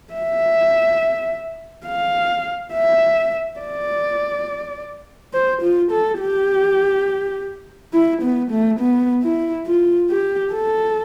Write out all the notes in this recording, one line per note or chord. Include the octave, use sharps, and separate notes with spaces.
E5
F5
E5
D5
C5
F4
A4
G4
E4
B3
A3
B3
E4
F4
G4
A4